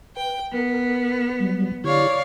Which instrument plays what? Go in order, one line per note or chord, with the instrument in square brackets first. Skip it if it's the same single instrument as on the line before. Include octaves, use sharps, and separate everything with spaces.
[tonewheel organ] B4 [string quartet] G5
[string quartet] B3 [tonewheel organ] A#4
[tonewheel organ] F#3 G3
[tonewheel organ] D3 E4 G4 [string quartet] C#5 D5 F5